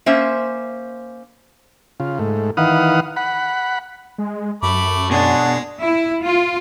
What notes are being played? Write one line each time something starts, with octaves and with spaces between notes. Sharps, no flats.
A#3 C#4 C5 E5
C#3 F4
G#2 A3
D#3 E3 B4 F5 F#5 D#6
F#5 B5
G#3
F#2 A3 B5 D6
B2 G#3 D4 C#5 F#5 A5
E4
F4